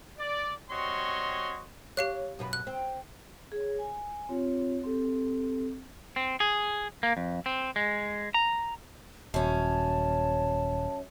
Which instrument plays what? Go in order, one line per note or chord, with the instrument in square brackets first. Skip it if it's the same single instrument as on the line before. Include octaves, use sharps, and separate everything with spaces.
[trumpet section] D5
G3 C4 F#4 C#5 D#5 C6
[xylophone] G4 F5 F#6 [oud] C#5
[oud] F#2 B2 B4
[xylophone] F#6
[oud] C4
[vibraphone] G#4 C#5
G#5
C4 F4 G4 C#5
C4 G4 A4
[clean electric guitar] C4
G#4
A#3
F2
C4
G#3
A#5
[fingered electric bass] D#1 [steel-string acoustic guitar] F#2 C#4 [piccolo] A5